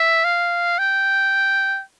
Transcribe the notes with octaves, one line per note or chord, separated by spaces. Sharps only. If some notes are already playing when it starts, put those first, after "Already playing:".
Already playing: E5
F5
G5